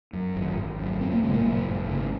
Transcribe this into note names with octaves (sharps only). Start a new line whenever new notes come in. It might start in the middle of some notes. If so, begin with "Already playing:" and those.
F#2
G#1
G#1
F#2
G#1 C4
A#3
C#3 G#3
A#2 A#3
F#2
G#1
C#3